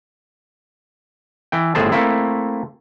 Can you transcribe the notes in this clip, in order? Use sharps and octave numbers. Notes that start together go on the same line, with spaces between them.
E3 G5
G1 A2 G#4 C5 A5
A3 A#3 C4 E4